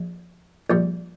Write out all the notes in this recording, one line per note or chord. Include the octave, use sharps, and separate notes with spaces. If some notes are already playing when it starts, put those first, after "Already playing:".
Already playing: A#1
A#1 A#2 G3